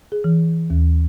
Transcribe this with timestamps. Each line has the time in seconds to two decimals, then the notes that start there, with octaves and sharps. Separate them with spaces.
0.12 G#4
0.24 E3
0.70 D#2